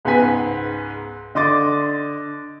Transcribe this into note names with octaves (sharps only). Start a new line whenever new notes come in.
C#2 G#2 B3 B4 G#5 B6
D3 D#5 C6 D6 A6